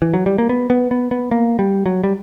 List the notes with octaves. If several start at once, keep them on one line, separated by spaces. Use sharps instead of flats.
E3
F#3
G3
A#3
B3
B3
B3
B3
A#3
G3
F#3
G3